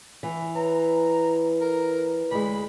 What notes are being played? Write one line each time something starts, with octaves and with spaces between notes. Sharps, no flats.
E3
B4 C#5 A#5
A#4
D2 G#3 B5